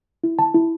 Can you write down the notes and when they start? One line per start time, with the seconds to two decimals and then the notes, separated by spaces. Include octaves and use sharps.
0.24 E4
0.39 A5
0.55 E4